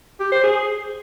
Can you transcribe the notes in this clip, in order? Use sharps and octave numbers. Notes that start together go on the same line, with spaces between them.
G4
C5
G#4